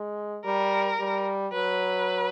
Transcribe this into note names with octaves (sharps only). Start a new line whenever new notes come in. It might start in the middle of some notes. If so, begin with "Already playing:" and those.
Already playing: G#3
G3 A#4
G3
F#3 B4